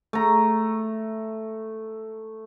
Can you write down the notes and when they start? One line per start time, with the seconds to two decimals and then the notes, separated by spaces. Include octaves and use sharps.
0.13 A3 A#5